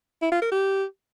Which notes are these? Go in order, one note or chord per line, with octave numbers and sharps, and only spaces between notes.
E4
F4
A#4
G4